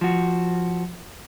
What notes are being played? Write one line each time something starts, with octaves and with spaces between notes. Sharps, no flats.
F3 F#4